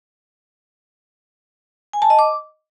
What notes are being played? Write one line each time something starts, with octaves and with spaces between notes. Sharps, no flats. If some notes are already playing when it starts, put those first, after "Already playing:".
G#5
A5
D#5
D6